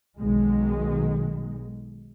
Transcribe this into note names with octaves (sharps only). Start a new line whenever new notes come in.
B1 D#3 G#3